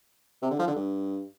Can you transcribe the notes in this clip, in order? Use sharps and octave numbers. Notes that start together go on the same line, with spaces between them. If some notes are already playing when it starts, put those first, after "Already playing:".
C3
D3
F3
D3
G2